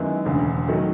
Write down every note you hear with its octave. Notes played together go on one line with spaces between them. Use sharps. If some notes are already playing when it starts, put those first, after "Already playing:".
Already playing: F#2 D#3 G#3 B3 E4
E1 D2 C#3
D#3 F#3 A3